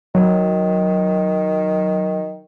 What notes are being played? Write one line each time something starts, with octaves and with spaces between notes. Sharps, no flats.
D#3 F#3